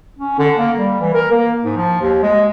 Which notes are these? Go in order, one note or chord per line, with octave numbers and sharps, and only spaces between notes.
C#4
D3
A#3
G3
E3
A#4
A#3
G#2
F3
D#2
G#3